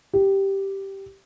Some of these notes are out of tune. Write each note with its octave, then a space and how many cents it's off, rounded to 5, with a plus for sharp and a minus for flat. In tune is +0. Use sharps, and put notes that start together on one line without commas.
G4 -5